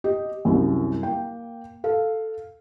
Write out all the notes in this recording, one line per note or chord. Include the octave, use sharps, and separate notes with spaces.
G4 D#5
C2 F#2
A#3 G5
A4 F5